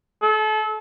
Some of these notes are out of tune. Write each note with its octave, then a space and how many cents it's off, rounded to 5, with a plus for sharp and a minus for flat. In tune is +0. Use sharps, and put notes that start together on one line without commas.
A4 -35